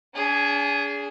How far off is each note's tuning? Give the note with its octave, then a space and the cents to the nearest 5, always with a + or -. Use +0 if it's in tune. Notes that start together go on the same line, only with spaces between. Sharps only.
D4 -40 G#4 +0